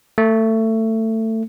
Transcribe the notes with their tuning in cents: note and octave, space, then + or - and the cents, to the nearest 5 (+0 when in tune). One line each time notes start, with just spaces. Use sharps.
A3 +20